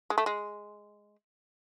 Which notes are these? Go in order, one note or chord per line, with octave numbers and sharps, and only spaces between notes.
G#3
A3
G#3